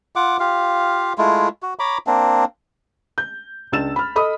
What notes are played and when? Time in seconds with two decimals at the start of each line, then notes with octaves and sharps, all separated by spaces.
0.16 F4 F#5 D6
0.40 F4 G4 F5
1.18 G#3 A3 E4 F4
1.62 F#4
1.79 C#5 A#5 B5 D6
2.07 A#3 C4 D4
3.18 G6
3.72 C#2 D4 E6 A6 E7
3.96 B5 F6
4.16 A4 D#5 B5 D#6